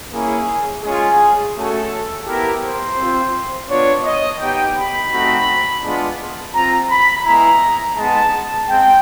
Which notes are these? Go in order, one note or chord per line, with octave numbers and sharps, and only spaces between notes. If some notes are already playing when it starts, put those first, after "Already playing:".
A#3 C#4 E4 G#4
G#3 C#4 F4 G#4
A3 C#4 F#4 A4
B3 E4 G4 A#4
C5
C4 F4
B3 D4 F4 C#5
D#5
B3 D#4 G4 G5
B5
A3 C4 D#4 F#4
G#3 B3 D4 F4
C4 F4 A#5
B5
G#3 B3 E4 A#5
G#3 B3 D#4 A5
G#3 C4 G5